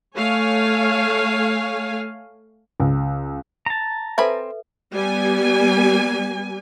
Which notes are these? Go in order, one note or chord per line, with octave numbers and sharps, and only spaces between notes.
A3 C#5 F5 G#5
C#2
A5 A#5
C4 A4 B4 E5 G#5 B5
G3 B3 G#5